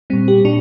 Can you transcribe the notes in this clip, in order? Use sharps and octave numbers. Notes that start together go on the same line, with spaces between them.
A#2 G3 C4
G4
A#2 D4